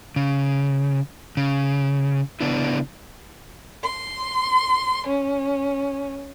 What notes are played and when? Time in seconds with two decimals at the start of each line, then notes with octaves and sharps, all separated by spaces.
0.16 C#3
1.37 C#3
2.41 C#3 B3 D4 E4
3.85 C6
5.07 C#4